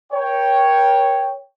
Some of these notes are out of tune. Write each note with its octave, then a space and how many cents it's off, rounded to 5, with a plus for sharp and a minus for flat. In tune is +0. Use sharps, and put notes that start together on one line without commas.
A#4 +30 C#5 +0 G5 +0